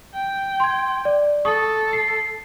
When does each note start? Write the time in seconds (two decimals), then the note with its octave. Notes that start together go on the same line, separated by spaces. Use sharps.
0.14 G5
0.60 C6 G#6
1.05 D5
1.45 A4 C#6 D#6
1.93 C7